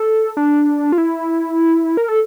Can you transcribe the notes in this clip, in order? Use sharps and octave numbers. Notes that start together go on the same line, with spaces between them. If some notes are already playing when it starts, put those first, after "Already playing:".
Already playing: A4
D4
F4
E4
A#4
A4